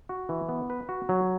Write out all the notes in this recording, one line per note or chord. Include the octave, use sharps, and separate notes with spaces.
F#4
E3
B3
B4
F#4
F#3